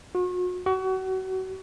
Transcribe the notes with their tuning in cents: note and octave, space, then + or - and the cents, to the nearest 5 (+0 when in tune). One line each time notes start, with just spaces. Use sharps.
F#4 -40
F#4 +30